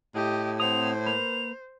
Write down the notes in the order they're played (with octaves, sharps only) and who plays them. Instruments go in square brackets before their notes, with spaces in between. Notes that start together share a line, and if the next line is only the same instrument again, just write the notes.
[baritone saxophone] A2 [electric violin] G4 D#5
[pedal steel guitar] C4 F#5 D#6 [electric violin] C5 [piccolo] F7
[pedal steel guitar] A#3 A#4 B4 [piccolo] F7